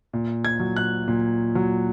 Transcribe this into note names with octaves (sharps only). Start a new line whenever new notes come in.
A#2
G#6
F#3
F#6
A#2
F#3